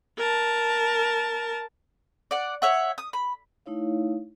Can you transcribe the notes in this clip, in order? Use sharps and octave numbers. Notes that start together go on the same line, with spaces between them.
A#4 A5
D5 F#5
C#5 E5 F#5
D#6
B5
A3 D#4 E4 C#5 F5